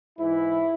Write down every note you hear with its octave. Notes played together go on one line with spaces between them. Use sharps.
G#2 E3 E4